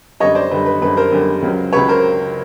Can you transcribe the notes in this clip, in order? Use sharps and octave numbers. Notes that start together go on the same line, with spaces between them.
F#2 D3 G3 C#5 D#5
C5 D5
F#2 D3 G3 B4
B4
F#2 D3 G3 B4
A#4 C5
F#2 D3 G3
C#2 C#3 F#3
C#2 C#3 F#3 B4 C#5
A#4 C5